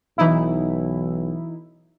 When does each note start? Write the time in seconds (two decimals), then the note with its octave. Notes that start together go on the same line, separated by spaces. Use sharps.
0.18 B1 E3 D#4 E4